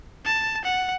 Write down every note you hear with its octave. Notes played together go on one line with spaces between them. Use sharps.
A5
F#5